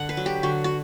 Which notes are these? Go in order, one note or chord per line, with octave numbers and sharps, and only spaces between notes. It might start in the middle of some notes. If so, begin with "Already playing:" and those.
Already playing: D3 F#5
B4
F#3
G4
D3 F#4
F#4